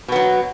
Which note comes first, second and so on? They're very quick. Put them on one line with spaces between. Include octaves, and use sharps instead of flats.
B2 B3 F#3